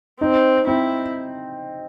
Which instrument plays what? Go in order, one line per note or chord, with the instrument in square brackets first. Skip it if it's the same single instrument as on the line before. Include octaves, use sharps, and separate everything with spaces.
[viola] C4 [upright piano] D#4
[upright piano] C4 [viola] E4